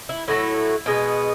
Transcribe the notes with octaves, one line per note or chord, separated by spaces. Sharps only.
E4
A2 F#3 A3 E4
B2 G#3 B3